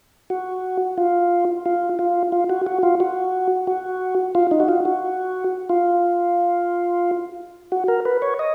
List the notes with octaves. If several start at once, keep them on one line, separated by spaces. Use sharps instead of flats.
F#4
F4
F4
F4
F4
F#4
F#4
F4
F#4
F#4
F4
D#4
F#4
F4
F#4
F4
F#4
A#4
B4
C#5
D#5